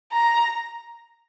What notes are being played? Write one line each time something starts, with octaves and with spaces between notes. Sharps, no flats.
A#5